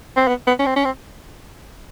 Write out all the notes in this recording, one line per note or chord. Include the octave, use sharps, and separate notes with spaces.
C4
B3
B3
C#4
C4
C#4
C4